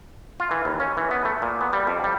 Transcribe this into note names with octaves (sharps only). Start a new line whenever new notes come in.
F4
E3
D#2
C#4
E3
B3
A3
A#2
B3
G3
F2
G3